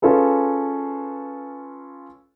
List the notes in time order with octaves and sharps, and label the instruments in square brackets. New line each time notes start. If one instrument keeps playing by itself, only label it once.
[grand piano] C#4 F4 G#4 A4 B4